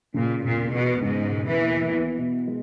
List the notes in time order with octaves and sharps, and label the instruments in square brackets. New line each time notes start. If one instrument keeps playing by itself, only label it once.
[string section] A#2 [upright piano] C#3
[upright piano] E1 [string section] A#2
[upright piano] E2 [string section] B2
[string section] G#2 [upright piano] C#3
[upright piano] E1
[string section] E3
[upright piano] D#2
B3
B2
G#3